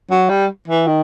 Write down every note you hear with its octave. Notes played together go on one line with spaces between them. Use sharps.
F#3
G3
E3
D#3